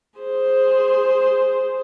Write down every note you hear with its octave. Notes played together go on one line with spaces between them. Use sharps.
G#4 C5